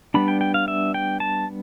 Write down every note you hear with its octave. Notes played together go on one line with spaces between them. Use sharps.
G3 B3 D4 B5
G5
G5
F5
E5
G5
A5